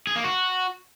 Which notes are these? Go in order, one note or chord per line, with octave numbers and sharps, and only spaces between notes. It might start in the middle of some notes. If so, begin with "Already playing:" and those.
G#4
A#3
F#4